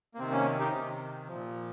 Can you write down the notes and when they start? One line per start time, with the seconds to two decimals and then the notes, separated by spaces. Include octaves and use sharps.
0.15 A#3
0.19 C3 D#3 C4
0.32 A#3 C#4
0.60 D#4 G4
0.73 C3 D#3
1.28 A#2 F3